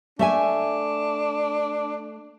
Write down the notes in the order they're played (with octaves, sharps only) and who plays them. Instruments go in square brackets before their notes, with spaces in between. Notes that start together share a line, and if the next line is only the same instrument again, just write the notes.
[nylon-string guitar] A3 E5 G#5 [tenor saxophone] D4